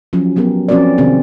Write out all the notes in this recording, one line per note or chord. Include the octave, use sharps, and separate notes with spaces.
F3 F#3 C#4
F3 F#3 B3 G4 A#4
F3 C4 C#4 F#4 A#4 D5
C3 D#3 B3 C4 D4 G#4